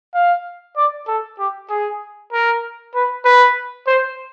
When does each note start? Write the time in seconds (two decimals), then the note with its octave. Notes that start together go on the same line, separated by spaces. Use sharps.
0.14 F5
0.77 D5
1.07 A4
1.39 G4
1.69 G#4
2.33 A#4
2.94 B4
3.25 B4
3.87 C5